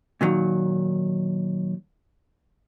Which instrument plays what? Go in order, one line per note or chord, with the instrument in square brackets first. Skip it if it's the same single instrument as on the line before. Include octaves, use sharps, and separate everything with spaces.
[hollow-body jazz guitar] A#2 D#3 F#3